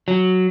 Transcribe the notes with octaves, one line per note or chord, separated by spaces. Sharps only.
F#3